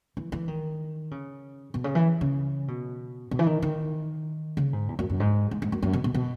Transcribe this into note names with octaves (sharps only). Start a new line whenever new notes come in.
E3
E3
D#3
C#3
B2
C#3
E3
C#3
B2
B2
E3
D#3
D#3
C#3
G#2
E2
F#2
F#2
G#2
G#2
G#2
F#2
F#2
B2
B2
B2